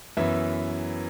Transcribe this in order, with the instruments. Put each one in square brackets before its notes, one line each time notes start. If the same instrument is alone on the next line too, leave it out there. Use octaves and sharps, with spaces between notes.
[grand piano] F#2 E3 B3 E5